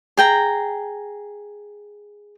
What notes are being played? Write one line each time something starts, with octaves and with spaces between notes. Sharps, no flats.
G#4 G5 A#5